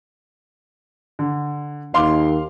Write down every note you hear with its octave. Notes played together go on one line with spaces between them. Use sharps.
D3
D#2 F5 C6 D6